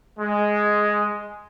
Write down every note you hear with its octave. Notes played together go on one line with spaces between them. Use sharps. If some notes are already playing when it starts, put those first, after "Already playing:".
G#3